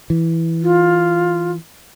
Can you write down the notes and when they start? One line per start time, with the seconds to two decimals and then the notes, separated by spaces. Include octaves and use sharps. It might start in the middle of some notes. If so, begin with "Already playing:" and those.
0.10 E3
0.62 F4